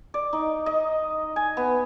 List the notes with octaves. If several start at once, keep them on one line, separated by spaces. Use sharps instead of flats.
D5
D#4
D#5
G#5
B3